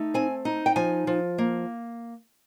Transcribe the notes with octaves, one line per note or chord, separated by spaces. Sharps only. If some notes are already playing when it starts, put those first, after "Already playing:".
Already playing: A3 D#4
C4 G#5
D#4
G5
F3 G#5
F3
A#3